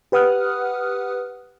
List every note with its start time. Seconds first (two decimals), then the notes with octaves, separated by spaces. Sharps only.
0.12 G4 B4 F#5 D#6 F6 F#6